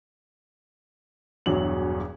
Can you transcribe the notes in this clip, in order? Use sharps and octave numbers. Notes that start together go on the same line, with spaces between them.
E1 E2 G2 F#3 F#7